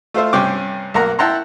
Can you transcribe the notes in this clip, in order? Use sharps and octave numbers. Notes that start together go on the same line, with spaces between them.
A3 F4 C5 E5
G2 C3 C#4 G5 D6
B1 A#3 A#4 F#5 A#5
E4 F#5 G5 A5 A#5 C6